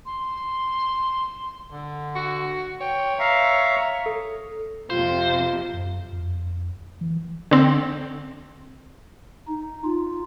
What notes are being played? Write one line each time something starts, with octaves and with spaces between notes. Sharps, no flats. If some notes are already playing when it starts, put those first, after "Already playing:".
C6
D3
F#4
C#5 G5
E5 F5 A#5
A4
F2 C3 F4 C5
F#2
F2
E3
D3 C4
D#4
F4